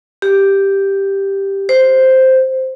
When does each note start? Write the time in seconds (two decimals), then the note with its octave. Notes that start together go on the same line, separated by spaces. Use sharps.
0.22 G4
1.69 C5